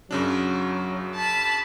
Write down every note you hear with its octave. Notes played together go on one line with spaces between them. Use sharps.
F#2 C#3 F#3 D4
A5 B5